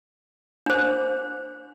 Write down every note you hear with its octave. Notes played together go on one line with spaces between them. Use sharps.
D4 C5